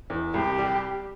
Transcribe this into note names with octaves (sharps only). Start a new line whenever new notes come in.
E2
C2 G4
G3